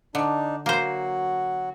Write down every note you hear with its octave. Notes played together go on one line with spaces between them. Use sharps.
D3 D4 D#4
F#3 A#3 F#4 C5